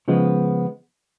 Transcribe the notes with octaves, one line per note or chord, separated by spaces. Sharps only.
C#3 F3 G#3 B3